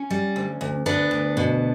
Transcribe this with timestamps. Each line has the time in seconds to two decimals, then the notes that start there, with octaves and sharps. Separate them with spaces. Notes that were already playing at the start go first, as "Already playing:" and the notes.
Already playing: C#4
0.10 G3
0.36 D2
0.61 D2
0.86 D2 B3 D4
1.11 D2
1.37 B2